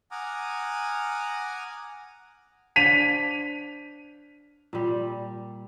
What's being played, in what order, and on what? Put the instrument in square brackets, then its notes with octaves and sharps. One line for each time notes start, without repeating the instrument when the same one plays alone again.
[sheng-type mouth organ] F#5 G#5 A#5 D6 D#6 F6
[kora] D4 C5 C#5 [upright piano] B6 D#7 F7
[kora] A#2 G3